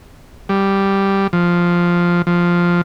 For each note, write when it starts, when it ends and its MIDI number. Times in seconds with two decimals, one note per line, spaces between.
0.49 1.27 55
1.33 2.22 53
2.27 2.81 53